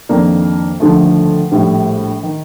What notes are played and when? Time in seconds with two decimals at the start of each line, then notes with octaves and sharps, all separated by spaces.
0.09 F2 D#3 A#3 D4
0.80 D#2 D3 F3 A3
1.52 A#1 A2 G3
2.23 D#3